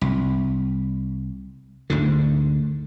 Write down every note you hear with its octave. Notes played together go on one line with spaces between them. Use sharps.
C2
D2 G#2 D3